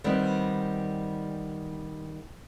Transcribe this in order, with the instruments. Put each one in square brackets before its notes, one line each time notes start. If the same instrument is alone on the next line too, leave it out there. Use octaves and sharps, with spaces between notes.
[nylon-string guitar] D#3 G3 B3 C4